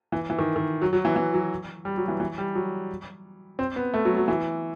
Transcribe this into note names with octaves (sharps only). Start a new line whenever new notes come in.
E3
E3
D#3
D#3
F#3
F#3
E3
E3
F#3
G3
F#3
E3
E3
G3
F#3
C4
B3
A3
F#3
F#3
E3